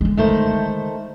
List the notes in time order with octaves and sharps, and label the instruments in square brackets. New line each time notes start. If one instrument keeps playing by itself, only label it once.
[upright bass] D3 G#3
[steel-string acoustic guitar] D#3 A3 C5